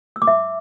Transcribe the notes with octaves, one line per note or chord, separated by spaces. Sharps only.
E6
D6
E5